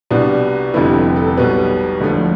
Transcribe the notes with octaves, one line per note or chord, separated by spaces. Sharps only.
C2 B2 G3 B3 D4
F1 F2 D3 G3 B3 E4
G4
A4
A4
B1 B2 G3 B3 B4
E1 D2 D3 F3 A3